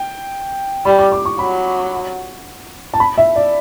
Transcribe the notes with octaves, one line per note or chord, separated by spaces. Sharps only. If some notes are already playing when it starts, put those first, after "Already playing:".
Already playing: G5
G3 B5
D6
D6
C#6
F#3 B5
A5
B5
E5
D5